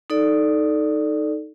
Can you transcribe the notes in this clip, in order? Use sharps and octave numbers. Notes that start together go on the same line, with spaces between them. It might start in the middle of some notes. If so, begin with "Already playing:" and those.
D#4 A4 D5